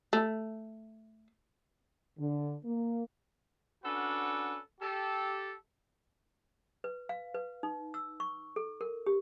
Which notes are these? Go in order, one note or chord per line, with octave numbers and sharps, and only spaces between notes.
A3
D3
A#3
C#4 D4 F#4 A4 B4 F#5
G4 A4
B4
F5
B4
D#4
E6
C#6
A4
A#4
G4